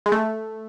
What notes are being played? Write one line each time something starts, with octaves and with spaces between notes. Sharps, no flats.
G#3
A3